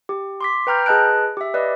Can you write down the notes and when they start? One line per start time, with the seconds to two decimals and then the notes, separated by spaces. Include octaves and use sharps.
0.09 G4
0.41 C6 D6 B6
0.67 B4 G5 A#5 F6 G6
0.86 G#4 B4 D#5 A5 F#6 D7
1.37 G4 E5
1.54 B4 D5 D#5